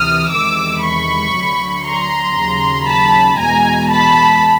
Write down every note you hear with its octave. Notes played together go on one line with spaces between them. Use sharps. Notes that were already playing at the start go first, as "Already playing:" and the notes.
Already playing: D2 C3 E3 D#6 F6
E2 C3 D#3 G#3 D6 E6
B5 C#6
D2 D3 F#3
A#5 C6
D#2 C#3 F#3
A5 B5
E2 B2 G#3 G#5 A#5
A5 B5